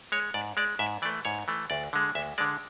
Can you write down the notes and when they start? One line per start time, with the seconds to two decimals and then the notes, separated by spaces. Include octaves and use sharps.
0.12 G#3 C#5
0.34 G#2 D5
0.57 G#3 D5
0.79 G#2 E5
1.02 E3 D5
1.05 A3
1.25 G#2 C#5
1.48 E3 A3
1.70 D2 D5
1.93 D3 G#3
2.15 D2 E5
2.38 D3 G#3 D5